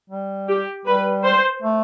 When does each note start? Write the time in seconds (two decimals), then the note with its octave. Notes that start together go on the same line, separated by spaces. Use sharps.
0.10 G3
0.48 G4
0.86 G3 B4
1.24 C5
1.62 A3